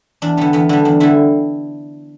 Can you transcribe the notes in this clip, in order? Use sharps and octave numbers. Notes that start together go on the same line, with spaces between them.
E2 D4
D3 G3 B3
E2 B3
D3 G3 D4
E2 D4
D3 G3 E4